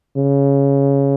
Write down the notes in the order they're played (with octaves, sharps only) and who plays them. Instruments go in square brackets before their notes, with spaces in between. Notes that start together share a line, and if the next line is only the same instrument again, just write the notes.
[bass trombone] C#3